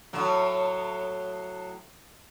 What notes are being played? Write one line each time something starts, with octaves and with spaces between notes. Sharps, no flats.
A2 F#3